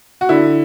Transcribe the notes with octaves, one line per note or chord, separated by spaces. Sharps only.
F#4
D3 E4